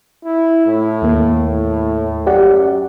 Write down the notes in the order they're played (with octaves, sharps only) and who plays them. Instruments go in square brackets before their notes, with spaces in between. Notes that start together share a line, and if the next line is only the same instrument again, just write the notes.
[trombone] E4
A2
[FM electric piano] D#2 A#3
[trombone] A2
[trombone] F#2 [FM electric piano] G4 D5 F#5